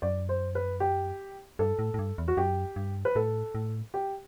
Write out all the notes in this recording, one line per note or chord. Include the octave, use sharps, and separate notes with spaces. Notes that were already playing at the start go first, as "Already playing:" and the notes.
F#2 D5
C5
B4
G4
G2 A4
A2
A2
G2
E2
F#4
F#2 G4
G2
B4
A2 A4
A2
G4